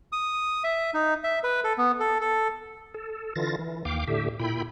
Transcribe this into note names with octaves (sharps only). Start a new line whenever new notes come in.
D#6
E5
D#4
E5
B4
A4
B3
A4
A4
A4
D3 E3 F4 A6 A#6
E3
D#2 F5 G5 D6
A2 D3 G4 E5
A#2 E4 G5 B5